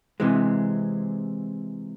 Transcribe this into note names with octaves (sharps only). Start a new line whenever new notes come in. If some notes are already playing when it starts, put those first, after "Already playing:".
C3 E3 G#3